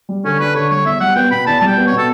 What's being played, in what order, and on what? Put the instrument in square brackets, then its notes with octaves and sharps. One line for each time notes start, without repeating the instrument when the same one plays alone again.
[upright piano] G3
[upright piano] D3 [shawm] C#4
[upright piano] D4 [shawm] B4
[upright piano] D3 [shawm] C#5
[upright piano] G3 [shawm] C#5
[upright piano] E2 [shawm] E5
[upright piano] G3 [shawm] F#5
[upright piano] B3 [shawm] G5
[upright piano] B2 [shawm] B5
[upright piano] E2 [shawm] A5
[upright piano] G3 [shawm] A5
[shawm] G5
[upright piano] B3
[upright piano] B2 [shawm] C#5
[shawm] A4